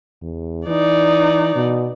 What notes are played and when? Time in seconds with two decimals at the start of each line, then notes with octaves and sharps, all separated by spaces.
0.22 E2
0.67 E3 D#4 D5
1.56 B2